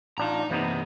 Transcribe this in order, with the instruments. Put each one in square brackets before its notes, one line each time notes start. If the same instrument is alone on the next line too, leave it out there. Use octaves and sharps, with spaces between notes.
[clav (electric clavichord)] A1 D4 F4 [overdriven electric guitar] D#4 A#5
[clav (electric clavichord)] C3 B3 D#4 [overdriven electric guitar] E3 A#3